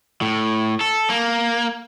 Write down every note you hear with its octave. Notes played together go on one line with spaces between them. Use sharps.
A2
A4
A#3